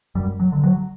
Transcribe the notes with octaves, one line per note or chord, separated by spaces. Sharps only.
F#2 G3
F#3
D3
F#3